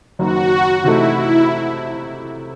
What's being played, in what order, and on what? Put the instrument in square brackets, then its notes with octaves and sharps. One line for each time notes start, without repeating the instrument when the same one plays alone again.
[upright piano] F#1 F#2 D#3 F#3 [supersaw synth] F#4
[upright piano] C3 E3 A3 D#4 A4 [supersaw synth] E4
[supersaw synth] E4